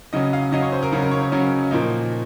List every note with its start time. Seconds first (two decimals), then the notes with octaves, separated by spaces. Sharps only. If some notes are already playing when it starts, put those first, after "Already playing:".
0.13 C#3 F#3 C#4 D#5
0.33 F5
0.52 C#3 F#3 C#4 D#5
0.62 C#5
0.72 C5
0.83 A#4
0.92 C#3 F#3 C#4
1.02 A#4
1.11 C#5
1.22 C#5
1.32 C#3 F#3 C#4
1.71 A#2 F3 A#3 D#4